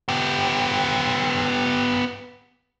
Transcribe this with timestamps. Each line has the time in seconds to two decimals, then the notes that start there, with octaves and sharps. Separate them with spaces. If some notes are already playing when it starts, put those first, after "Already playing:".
0.09 B3 G4